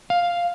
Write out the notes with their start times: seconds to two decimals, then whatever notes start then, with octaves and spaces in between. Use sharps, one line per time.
0.10 F5